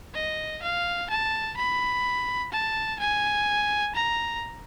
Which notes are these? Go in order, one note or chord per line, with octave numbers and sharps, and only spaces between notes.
D#5
F5
A5
B5
A5
G#5
A#5